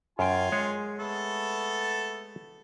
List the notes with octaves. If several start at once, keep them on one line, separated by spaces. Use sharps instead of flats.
F#2 F4 G5 G#5
G#3 G#4 C#5
A3 B3 A4